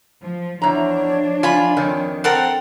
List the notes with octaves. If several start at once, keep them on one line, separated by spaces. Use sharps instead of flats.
F3
E2 F3 D4 C#5 A#5
F4 G#5 B5
F2 D#3 C#5
C4 A4 A#4 F#5 G5